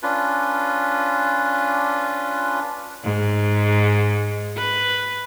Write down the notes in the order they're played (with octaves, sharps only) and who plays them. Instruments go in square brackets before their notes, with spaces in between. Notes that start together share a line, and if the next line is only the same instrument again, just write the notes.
[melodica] C#4 D4 F4 B4
[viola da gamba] G#2
B4